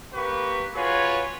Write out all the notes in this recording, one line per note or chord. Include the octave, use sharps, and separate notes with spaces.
A#3 G4 B4 C#6
F4 F#4 G#4 B4 C#5